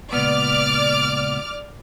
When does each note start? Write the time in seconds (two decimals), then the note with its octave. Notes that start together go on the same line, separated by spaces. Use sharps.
0.13 C#2 A#2 B3 D5 D6 F6